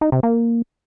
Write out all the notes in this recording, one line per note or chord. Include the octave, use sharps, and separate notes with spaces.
D#4
C3
A#3